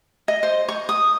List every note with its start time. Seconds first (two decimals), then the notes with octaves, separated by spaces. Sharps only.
0.28 D#5
0.43 C5
0.69 C#6
0.89 D#6